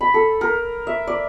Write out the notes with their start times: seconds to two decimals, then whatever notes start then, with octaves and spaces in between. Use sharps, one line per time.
0.01 B5
0.14 A4
0.41 A#4
0.87 E5
1.07 D5